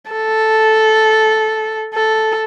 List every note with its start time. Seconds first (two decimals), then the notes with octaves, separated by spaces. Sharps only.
0.11 A4
1.94 A4